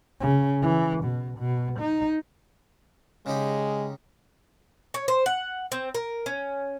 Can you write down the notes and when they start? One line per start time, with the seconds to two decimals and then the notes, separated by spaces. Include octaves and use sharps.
0.20 C#3
0.62 E3
1.04 B2
1.39 B2
1.80 D#4
3.26 C#3 G#3 D#4 G4
4.94 C#5
5.08 C5
5.26 F#5
5.72 C4
5.95 A#4
6.26 C#4